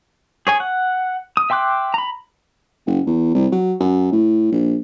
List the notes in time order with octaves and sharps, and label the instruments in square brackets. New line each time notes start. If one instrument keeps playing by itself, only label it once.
[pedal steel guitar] G#4 C#5 G#5
F#5
D#6
E5 G5 C6 D6 F#6
A#5 B5
[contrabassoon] F#1
E2
C2
F#3
F#2
A2
A#1